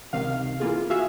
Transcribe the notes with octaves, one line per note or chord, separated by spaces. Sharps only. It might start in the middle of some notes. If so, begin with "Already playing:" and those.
C#2 C3 D#3 F5
E3 A#3 F4 G#4
F#4 G#4 E5 F5